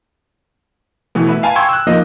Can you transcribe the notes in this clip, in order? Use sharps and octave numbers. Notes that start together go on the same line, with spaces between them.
B2 E3 A3 B3
B4 E5
F5 G#5 A5 B5
G5 C6 C#6 E6 G#6
E6 F#6
F3 A#3 D#4 D#5